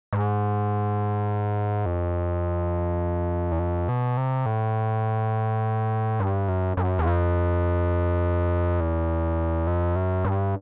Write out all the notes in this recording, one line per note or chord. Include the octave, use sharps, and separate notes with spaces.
G#2
F2
E2
F2
B2
C3
A2
G2
F#2
F#2
E2
F2
E2
F2
F#2
G2